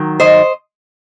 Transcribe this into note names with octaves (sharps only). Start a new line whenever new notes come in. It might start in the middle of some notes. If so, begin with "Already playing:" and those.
Already playing: D#3 F#3
C5 D#5